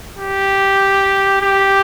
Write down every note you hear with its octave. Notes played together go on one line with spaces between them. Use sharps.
G4
G4